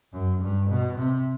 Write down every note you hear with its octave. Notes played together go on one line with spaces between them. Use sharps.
F#2
G2
B2
C3